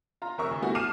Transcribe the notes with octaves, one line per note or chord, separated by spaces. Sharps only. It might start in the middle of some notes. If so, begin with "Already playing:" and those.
F4 A#5
F1 A#4 E5 C#6 E6
D2
G3 A3 B3 E4 F#4
A5 D6 F6 C7 D#7 E7